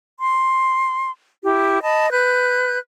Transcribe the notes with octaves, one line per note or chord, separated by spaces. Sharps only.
C6
E4 G4
D#5 A5 B5
B4 F#6 G6